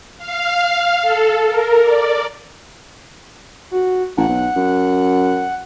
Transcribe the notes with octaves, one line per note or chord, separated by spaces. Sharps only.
F5
A4
A#4
D5
F#4
A1 F#5
B1
F#2